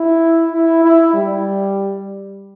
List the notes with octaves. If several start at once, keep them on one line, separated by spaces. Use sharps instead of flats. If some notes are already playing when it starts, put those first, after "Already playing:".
Already playing: E4
E4
E4
G3